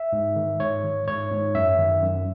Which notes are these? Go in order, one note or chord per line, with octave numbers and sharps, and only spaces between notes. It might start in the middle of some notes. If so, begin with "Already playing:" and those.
Already playing: E5
G#2
D#3
G#2 C#5
D#3
G#2 C#5
G#2
F#2 E5
D#3
F#2